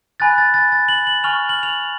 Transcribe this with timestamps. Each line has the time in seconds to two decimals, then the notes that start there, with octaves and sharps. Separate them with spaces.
0.20 G#5 B5 F#6 A6
0.38 A6
0.54 A6
0.72 A6
0.89 F#7
1.07 F#7
1.24 G#5 C#6 F6 F7
1.49 F#7
1.63 F7